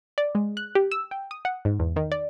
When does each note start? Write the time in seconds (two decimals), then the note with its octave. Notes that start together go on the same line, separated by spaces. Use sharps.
0.18 D5
0.35 G#3
0.57 F#6
0.75 G4
0.92 E6
1.11 G5
1.31 D#6
1.45 F#5
1.65 G#2
1.80 E2
1.96 D#3
2.12 D5